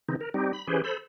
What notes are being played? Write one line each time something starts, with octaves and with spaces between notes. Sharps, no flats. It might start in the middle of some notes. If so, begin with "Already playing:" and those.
C#3 E3 C4 D#4
A#4
G3 C4 D#4 G4
B5
E3 C#4 G4 G#4 B4 C5
A4 C5 B5